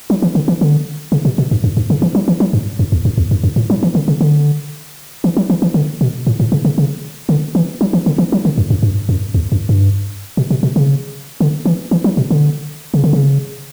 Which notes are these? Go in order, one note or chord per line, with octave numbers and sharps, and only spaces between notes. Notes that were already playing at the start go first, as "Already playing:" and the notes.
F#3
E3
D3
E3
D3
C#3
B2
B2
G2
F#2
G2
C#3
E3
F#3
E3
F#3
G2
F#2
E2
F#2
E2
F#2
F#2
A2
F#3
E3
D3
C#3
D3
E3
F#3
E3
E3
D3
B2
A2
A2
C#3
C#3
C#3
D3
E3
F#3
E3
D3
E3
F#3
D3
F#2
F#2
G2
F#2
E2
F#2
G2
B2
B2
B2
C#3
D3
E3
E3
F#3
B2
D3
C#3
D3
C#3